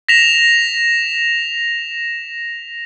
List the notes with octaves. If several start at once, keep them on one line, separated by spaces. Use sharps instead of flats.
A#6 B6 E7 F7